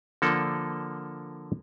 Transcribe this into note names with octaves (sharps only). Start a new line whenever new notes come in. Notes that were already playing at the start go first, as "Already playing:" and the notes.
D3 F3 A#3 A4 D5